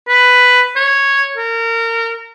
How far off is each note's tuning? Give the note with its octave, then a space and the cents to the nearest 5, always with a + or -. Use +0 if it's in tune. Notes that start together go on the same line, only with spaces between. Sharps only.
B4 +5
C#5 -5
A#4 -25